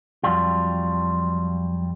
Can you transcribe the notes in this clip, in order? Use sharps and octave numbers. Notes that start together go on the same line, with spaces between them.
F2 F#3 G3 F4